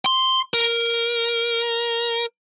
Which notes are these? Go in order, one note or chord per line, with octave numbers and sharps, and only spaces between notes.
C6
A#4